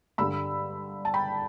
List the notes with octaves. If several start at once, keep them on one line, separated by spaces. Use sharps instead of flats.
G2 D3 G3 B5 E6
A5
G5 B5